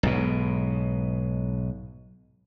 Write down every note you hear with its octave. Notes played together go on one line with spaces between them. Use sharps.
B1 G#2 B2